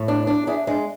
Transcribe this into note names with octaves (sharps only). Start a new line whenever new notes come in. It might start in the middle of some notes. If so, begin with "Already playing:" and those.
Already playing: A2
D4
D4
D4 E4 G#4
G#3 D4